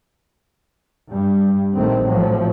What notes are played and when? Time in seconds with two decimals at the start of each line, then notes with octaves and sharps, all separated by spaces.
1.11 G2 G3
1.75 A#1 D#3 A3 C4
2.06 A1 A2 F3 F#3 A3